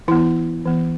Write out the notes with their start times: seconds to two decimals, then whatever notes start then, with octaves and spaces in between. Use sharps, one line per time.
0.08 E3 B3 E4
0.65 E3 B3